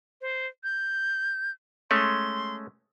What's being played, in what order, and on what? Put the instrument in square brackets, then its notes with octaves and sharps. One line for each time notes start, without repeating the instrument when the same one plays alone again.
[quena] C5
G6
[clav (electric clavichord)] G#3 A3 C#4 [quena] C6